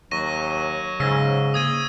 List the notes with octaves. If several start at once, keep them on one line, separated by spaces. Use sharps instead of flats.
D#2 F#3 C#6 A#6 D#7
G#2 C#3 E6 A#6
A#3 D#6 G#6 D#7